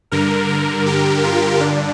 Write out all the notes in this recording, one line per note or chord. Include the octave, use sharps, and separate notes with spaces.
G2 D3 A#4
A#4
G4
F4
G2 D3 D4